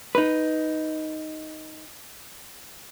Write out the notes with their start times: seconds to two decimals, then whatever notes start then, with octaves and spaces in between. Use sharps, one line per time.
0.15 D#4 B4